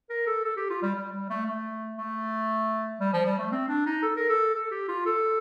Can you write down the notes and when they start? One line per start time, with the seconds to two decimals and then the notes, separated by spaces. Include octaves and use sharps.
0.09 A#4
0.26 A4
0.44 A4
0.56 G4
0.70 F4
0.82 G3
0.95 G3
1.12 G3
1.30 A3
1.46 A3
1.98 A3
3.00 G3
3.13 F3
3.25 G3
3.39 A3
3.52 C4
3.68 D4
3.86 D#4
4.02 A4
4.16 A#4
4.29 A4
4.54 A4
4.71 G4
4.89 F4
5.05 A4